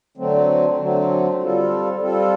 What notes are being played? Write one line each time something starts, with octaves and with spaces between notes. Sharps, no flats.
D3 F#3 A3 C4
D3 F#3 A3 C4
G3 C4 F4 A4
G3 C4 F4 A4